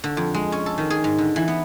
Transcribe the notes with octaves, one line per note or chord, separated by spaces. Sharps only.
D3
F2
G#3
C#4
A4
D#3
G#4
G#2
D3
E3
B3